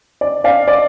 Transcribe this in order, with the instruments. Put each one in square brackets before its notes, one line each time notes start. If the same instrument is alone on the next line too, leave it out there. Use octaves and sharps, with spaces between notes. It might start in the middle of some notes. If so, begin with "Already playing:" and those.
[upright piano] D5
D5 F5
D5